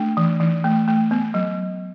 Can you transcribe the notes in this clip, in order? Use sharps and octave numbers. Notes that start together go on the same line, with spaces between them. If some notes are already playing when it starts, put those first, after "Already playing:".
Already playing: A3 D4
E3
E3
A3
A3
B3
F#3